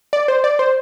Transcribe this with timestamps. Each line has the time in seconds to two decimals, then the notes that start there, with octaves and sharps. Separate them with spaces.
0.13 D5
0.28 C5
0.44 D5
0.59 C5